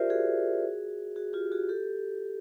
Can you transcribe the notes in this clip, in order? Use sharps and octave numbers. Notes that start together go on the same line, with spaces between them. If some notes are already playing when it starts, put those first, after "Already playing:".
Already playing: F4 G4 A#4 C5 D5 E5
F#4 G#4
F#4 G#4
F4 G4
F#4 G#4
G4 A4